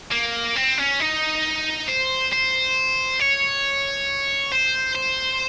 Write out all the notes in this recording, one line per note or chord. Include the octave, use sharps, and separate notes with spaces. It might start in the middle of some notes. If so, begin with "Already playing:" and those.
A#3
C4
C#4
D#4
C5
C5
C#5
C5
C5